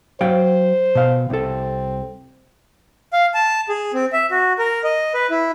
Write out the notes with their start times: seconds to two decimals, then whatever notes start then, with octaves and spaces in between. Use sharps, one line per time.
0.21 F#3 C5 F5 G5
0.95 B2 F5
1.30 C2 C4 A4
3.13 F5
3.34 A5
3.69 G#4
3.94 C4
4.13 E5
4.31 F#4
4.59 A#4
4.84 D#5
5.14 B4
5.31 E4